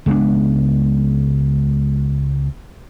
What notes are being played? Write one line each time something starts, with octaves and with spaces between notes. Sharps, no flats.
C#2 G#3 B3 D4